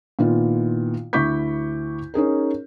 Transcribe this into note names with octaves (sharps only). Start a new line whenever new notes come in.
A#2 D#3 B3 E4 F4
D2 E4 C#6 D6 G6 B6
C#4 D#4 G#4 A#4